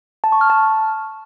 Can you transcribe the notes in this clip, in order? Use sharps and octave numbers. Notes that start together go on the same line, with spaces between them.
A5
C#6
F6
A5